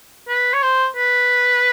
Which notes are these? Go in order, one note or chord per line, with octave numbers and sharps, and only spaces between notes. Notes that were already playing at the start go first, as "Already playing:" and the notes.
B4
C#5
C5
B4